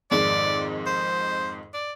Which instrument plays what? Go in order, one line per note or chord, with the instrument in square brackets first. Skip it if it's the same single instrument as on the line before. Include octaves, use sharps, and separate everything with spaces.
[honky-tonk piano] F2 G#2 D#3 [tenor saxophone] D5
[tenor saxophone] C5
D5